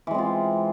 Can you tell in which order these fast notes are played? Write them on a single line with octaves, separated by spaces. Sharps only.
E3 G#3 C4 F4